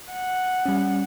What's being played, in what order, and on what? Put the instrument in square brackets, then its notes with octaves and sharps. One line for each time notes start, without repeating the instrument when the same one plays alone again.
[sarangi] F#5
[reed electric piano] G3 C#4